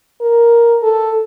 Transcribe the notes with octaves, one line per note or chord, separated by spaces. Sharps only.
A#4
A4